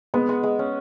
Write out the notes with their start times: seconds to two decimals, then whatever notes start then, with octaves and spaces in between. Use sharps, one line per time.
0.14 G#3 B3
0.29 G#3
0.43 G#3
0.59 C#4